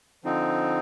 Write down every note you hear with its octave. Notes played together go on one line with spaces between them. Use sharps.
D3 F3 C4 D#4